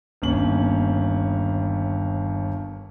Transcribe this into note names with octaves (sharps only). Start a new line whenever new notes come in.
G1 D#2 C#4 F#7